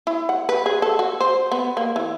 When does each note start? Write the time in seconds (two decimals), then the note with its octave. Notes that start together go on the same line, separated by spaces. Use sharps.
0.07 E4
0.29 F#5
0.49 B4
0.66 G#4
0.82 A4
0.99 F#4
1.21 C5
1.52 B3
1.77 A#3
1.96 E3